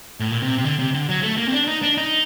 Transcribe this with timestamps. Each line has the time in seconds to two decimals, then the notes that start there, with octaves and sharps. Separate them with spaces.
0.20 A2
0.32 A#2
0.42 C3
0.58 C3
0.65 D3
0.79 C3
0.94 D3
1.09 F#3
1.23 A3
1.38 A#3
1.47 C4
1.52 D4
1.67 D#4
1.83 D4
1.98 D#4